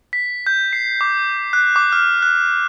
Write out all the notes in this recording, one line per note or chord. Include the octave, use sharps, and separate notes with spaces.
B6
G6
C7
D6
F#6
D6
F6
F#6